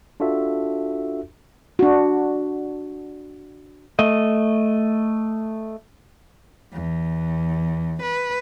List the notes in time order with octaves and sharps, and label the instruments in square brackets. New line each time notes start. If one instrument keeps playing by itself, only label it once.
[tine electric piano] D4 F4 F#4 A4 E5
[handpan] D4 F#4
[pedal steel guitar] A3 D#5
[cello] E2
B4